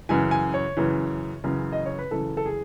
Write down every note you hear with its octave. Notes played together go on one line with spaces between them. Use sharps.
F#2 C#3 E3 G#5
G#5
C#5
F#2 C#3 E3
F#2 C#3 E3
D#5
C#5
B4
F#2 C#3 E3 A4
A4
G#4